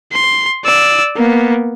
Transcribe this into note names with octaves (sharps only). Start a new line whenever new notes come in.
C6
D5 E6
A#3 B3